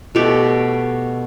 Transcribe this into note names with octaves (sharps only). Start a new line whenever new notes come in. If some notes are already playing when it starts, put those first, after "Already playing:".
B2 A3 G4